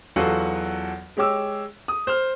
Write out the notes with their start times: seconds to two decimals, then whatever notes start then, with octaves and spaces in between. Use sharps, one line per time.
0.16 E2 F#3 F4 F#4 A4 F#5
1.17 G#3 G4 C#5 D6 E6
1.88 D#6
2.07 C5 F6